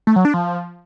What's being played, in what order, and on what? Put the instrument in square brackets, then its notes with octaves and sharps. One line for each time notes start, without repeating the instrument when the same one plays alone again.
[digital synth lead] A3
F#3
D4
F3